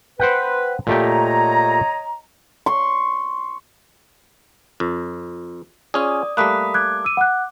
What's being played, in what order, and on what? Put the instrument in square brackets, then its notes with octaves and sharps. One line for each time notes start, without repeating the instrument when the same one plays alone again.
[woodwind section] B4 [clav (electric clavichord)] C5 F#5 G5
[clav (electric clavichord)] A#2 A3 G4 [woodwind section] C#5 D#5 A#5
[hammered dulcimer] C6 C#6
[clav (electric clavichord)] F2
[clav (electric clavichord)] C#4 F4 G#4 [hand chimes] D5 D#6
[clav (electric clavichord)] G3 A3 A#3 [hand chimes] B5 D#6 B6 [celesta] F#6
[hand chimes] D6 [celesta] F#6 G#6
[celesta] E6 D#7
F#5 F#6